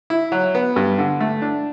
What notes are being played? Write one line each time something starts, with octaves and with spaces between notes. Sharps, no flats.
E4
F#3
B3
G2
D3
A3
D4